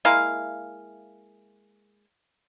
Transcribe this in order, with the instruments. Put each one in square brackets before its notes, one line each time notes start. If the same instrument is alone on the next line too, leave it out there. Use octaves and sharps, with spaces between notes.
[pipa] G#3 A#3 E4 F5